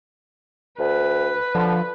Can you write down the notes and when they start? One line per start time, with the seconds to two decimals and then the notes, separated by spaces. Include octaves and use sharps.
0.79 D2 B4
1.55 D3 F3